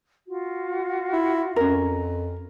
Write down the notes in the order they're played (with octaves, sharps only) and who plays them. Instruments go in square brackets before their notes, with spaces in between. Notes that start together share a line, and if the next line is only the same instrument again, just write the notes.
[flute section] F4 F#4
[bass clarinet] E4
[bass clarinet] F2 [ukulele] C#4 A#4